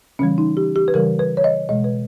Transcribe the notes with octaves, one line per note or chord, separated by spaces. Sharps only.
C#3 E3 G3 C#4
D#4
G4
G4
B4
C#3 E3 G3 A#4
B4
C#5
D#5
B2 G#3 D#5
B4